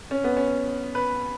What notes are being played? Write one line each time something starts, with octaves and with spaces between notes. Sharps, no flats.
C#4
B3
C#4
B4